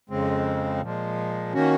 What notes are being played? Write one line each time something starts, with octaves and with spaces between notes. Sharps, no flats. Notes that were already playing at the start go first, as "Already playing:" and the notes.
F2 C#3 G#3 C4
A#2 F3 G#3
D#3 A#3 C#4 F#4